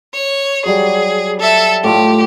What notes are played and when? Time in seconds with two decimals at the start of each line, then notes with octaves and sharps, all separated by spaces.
0.14 C#5
0.66 F#3 G3 G#4
1.40 A4 E5
1.84 A2 F4 G4 A4